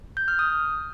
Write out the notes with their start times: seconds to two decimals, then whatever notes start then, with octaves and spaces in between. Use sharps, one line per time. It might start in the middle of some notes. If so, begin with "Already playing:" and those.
0.17 G6
0.28 F6
0.39 D#6